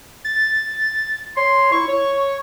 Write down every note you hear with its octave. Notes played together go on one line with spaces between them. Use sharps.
A6
C#5 C6
E4 C#6
C#5